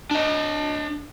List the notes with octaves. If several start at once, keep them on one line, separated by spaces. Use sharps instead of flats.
D4 D#5